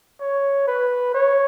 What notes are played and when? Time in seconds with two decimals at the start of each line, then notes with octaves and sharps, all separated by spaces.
0.21 C#5
0.67 B4
1.14 C#5